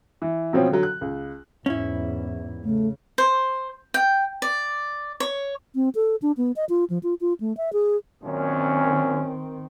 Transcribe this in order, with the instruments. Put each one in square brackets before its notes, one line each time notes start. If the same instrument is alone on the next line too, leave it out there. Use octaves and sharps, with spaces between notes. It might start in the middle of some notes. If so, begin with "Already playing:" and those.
[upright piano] E3
B2 F3 C4 C#4
D3 F#3
F#6
C#2
[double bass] E2 G#2 [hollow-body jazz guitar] C#4 E4
[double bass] C#3 [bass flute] A3
[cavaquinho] C5
G5
D5
C#5
[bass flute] C4
A4
D4
B3
D#5
F4
F3
F4
F4
A3
E5
G#4
[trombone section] F#2 A#2 C#4 [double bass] D#3 C4